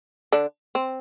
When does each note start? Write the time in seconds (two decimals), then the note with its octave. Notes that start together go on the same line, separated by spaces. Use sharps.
0.32 D3 D4
0.75 C4